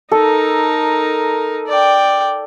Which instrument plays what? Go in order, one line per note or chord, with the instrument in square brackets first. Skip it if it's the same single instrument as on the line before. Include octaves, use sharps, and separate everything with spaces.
[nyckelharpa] D#4 A#4 [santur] A4
[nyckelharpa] D5 G5